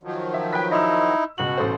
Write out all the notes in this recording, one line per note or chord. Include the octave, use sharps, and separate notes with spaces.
D#3 F3 F#3
E5
B4 G5 B6
D#4 E4 D#5 C6 E6
C#2 B2 F#4 F#7
A1 A4 C5